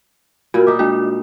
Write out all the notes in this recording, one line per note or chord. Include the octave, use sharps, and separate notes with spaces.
A#2 G3 F#4 A#4
D#4 E5 D6
G#3 D4 F#4